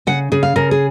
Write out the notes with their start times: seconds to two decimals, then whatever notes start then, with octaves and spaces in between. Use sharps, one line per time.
0.07 C#3 F#5
0.32 C#3 G#4
0.43 F5
0.56 C#3 A#4
0.71 G#4